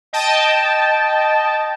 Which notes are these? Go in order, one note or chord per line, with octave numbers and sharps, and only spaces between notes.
D#5 G5 A5